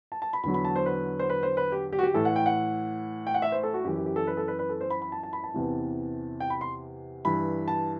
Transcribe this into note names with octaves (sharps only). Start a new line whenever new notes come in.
A5
A5
B5
E2 D3 F#3 B5
B5
A5
C5
B4
C5
B4
C5
B4
G4
G4
F#4
G4
A2 E3 A4
F#5
G5
F#5
G5
F#5
E5
C5
A4
F#4
F#2 E3 G4
G4
G4
A4
B4
A4
B4
B4
A4
C5
B5
B5
A5
A5
B5
A5
E2 C3 E3
G5
B5
C6
G2 E3 B5
A5